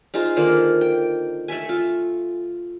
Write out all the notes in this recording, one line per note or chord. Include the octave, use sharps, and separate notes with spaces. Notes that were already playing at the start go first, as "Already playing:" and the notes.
D#4 F4 G#4 C5
D3 D#3 A#3 F4
G5
A3 A4 E5 G#5
F4